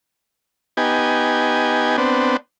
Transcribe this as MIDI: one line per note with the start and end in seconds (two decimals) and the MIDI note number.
0.77 1.97 59
0.77 1.97 63
0.77 1.97 67
0.77 1.97 80
1.98 2.37 59
1.98 2.37 60
1.98 2.37 62